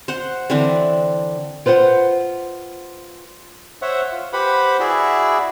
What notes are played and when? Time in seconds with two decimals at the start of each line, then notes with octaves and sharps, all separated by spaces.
0.08 C5 F#5
0.50 D3 E3 C4 D4
1.66 F4 B4 C5 D#5 F#5
3.82 C5 C#5 E5 F#5
4.12 F4
4.33 G4 B4 C5 F#5 B5
4.80 E4 F#4 G#4 D5 E5